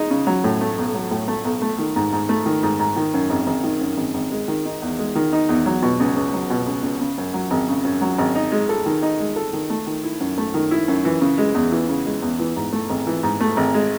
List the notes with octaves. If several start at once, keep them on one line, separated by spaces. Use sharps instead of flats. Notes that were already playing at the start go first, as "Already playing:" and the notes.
Already playing: G#3 D#4
C#3
F#3
A2
A3
B1
F#3
A2
A3
B1
A3
D#3
G#2
G#2
A3
D#3
G#2
G#2
D#3
F#2
G#1
G#1
D#3
F#2
G#1
G#1
G#3
D#3
D#4
E2
G#3
D#3
D#4
E2
F#3
B2
C#2
C#2
F#3
B2
C#2
C#2
C#3
F#2
F#3
G#1
C#3
F#2
F#3
G#1
D#4
G#3
A4
D#3
D#4
G#3
A4
D#3
A3
D#3
E4
F#2
A3
D#3
E4
F#2
E3
C#3
G#3
E2
E3
C#3
G#3
E2
E3
G#2
A3
G#1
E3
G#2
A3
G#1
G#3